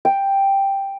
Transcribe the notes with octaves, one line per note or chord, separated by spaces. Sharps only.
G5